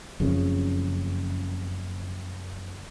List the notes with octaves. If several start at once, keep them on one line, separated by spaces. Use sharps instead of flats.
F#1 F2 C#3